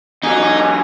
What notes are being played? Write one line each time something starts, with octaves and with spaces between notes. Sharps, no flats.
E2 F#3 D#4 G#5